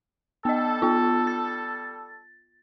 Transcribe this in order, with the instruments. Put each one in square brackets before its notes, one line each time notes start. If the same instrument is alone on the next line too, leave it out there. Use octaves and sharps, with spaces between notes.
[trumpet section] G3 A4 [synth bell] B3 D#5
[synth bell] B3 F4
A6